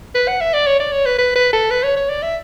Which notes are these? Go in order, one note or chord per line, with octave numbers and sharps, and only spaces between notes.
B4
F#5
E5
D5
C#5
D5
C#5
B4
B4
B4
A4
B4
C#5
C#5
D5
E5